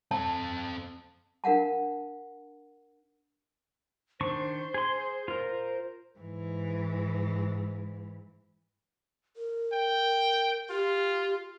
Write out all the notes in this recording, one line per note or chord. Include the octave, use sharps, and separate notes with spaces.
C4 A4 A5
D4 A#4 F5 F#5 A5
D#3 D4 C5 C#6
G#4 C6
F4 A#4
G#2 E3
A#4
G5
F4 G4